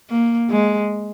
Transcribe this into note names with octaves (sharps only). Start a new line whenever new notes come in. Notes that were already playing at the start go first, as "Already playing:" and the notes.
A#3
G#3